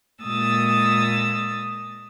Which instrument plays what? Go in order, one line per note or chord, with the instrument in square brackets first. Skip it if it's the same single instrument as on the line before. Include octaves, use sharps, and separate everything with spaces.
[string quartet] A#2 G#3 D#6 E6 A6